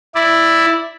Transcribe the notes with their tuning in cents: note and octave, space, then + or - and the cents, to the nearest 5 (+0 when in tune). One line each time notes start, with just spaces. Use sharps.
E4 +0 D5 +0